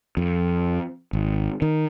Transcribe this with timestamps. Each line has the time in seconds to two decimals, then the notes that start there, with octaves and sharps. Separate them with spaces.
0.17 F2
1.13 G#1
1.62 D#3